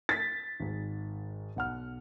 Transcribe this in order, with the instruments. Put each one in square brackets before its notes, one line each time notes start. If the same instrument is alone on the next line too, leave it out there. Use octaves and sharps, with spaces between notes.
[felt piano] A6 B6
[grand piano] G#1 G#2
B1 F#5 F6